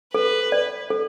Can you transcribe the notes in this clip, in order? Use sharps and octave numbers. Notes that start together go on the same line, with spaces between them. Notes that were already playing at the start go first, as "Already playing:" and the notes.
A4 B4
D5
A4